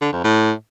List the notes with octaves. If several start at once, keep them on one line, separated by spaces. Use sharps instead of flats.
D3
F2
A2